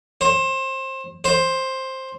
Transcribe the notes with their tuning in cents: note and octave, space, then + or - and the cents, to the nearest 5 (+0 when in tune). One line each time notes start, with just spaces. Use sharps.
C5 +25
C5 +10